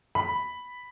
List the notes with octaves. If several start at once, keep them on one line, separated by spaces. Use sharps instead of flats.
B5